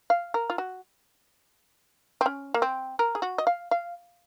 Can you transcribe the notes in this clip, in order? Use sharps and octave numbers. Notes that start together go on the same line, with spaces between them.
F5
A#4
F4
F#4
C4
C#4
A#3
C4
A#4
G#4
F#4
D#5
F5
F5